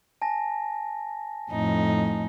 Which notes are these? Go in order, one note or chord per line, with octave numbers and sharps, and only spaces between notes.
G#5 A5 A#6
F2 A2 D#4